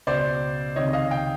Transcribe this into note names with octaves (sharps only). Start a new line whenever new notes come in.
C#2 B2 C5 D5
C#2 C3 D#3 C#5 D#5
D#5 F5
F5 G5